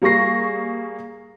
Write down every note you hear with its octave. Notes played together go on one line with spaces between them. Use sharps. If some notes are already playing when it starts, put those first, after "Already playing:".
G3 A#3 G#4 C#6 A#6 C7